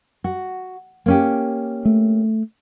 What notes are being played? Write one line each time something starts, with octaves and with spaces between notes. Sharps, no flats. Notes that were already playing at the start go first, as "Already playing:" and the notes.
F#4
A#3 C#4 G4
A3